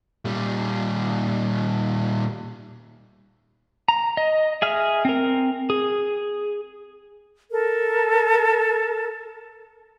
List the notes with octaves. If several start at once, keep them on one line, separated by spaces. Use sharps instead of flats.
A#2 G3
A#5
D#5
G#4 E5 F6
C4 A#4
G#4
A4 A#4